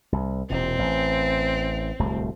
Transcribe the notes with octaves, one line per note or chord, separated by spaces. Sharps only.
C2
E1 A#2 C4
A1
D1 C2 A3